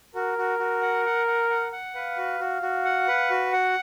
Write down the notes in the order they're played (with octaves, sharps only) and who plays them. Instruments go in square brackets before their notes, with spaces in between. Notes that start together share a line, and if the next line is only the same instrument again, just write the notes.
[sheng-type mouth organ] F#4 [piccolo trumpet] A#4
[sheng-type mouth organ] F#4
F#4
F#5
F#5
F#5
F#5
F#5
[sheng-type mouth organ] B4 [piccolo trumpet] F5
[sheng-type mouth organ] F#4
F#4
F#4
F#5
B4
F#4
F#5